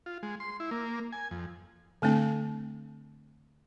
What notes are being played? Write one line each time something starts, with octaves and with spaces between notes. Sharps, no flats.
F4
G#3
C6
E4
A#3
G#5
F2
D3 A3 C4 D4